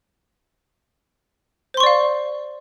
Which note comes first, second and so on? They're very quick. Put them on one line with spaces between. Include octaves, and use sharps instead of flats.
C5 C6 C#6 D5 F5